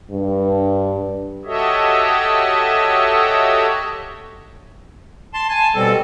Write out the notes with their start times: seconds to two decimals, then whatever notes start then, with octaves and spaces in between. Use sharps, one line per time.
0.11 G2
1.45 F#4 G4 A4 C#5 D#5 E5
5.34 A5 C6
5.49 G#5 A5
5.75 B2 G3 C4 A4